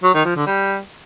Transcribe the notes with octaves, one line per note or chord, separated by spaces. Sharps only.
F#3
D#3
F3
D3
G3